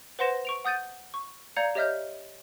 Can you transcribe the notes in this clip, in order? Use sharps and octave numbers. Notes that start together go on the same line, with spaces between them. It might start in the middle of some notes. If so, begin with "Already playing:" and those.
B4 C5 F#5 C6 A#6 E7
C#6 D7 F7
F#5 D#6 G6 A6 D#7
C#6
D5 F5 A#5 G6 G#6 C#7
G4 C#5 D#5 E5 F6 G6